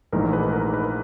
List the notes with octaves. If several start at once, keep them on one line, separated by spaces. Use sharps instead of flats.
A#1 G#2 E3 A3 A#4
B4
A#4
B4